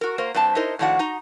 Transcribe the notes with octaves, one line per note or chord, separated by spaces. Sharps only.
F#4 A#4
A#3 A#4 C5
G2 C4 C5 A5
D#4 E4 A#4 C5 D#5
A2 D#3 F3 D4 F#4 F#5
D#4 A#5